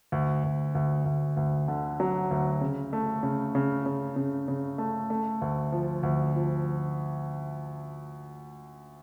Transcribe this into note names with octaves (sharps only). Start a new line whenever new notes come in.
D2
D2
D2
D2
D2
D3
F#3
D2
C#3
A3
C#3
C#3
C#3
C#3
C#3
A3
A3
D2
F3
D2
F3